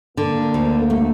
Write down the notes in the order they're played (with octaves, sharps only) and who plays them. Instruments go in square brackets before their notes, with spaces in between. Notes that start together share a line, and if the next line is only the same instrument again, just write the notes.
[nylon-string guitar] D3 [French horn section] A#3
[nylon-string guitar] D2
A3